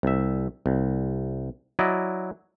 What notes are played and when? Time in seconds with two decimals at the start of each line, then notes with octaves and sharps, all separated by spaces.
0.03 C2 E5
0.66 C2
1.79 F#3 E4 D5 D#5